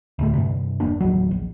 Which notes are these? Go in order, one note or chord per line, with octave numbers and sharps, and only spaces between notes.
D2 A2 A3
G2 C3
E1 A#3 D4
D#1 A1 F#3
A#1